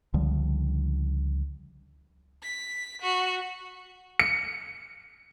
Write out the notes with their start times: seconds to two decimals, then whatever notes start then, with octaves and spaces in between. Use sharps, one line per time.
0.14 C#2 D3 F3 G3
2.43 B6
3.02 F#4
4.20 C#7